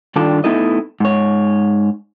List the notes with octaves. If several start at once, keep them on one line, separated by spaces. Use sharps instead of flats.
G2 D#3 D4 F4 A4 D5
A3 B3 D#4 E4 A4 D#5
G#2 C#5